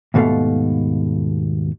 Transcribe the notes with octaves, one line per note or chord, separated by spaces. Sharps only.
D#2 G#2 B2 A3 A4 F5